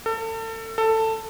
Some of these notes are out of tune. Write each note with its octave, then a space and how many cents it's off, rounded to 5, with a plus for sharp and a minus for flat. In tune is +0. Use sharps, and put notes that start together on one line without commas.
A4 +35
A4 +15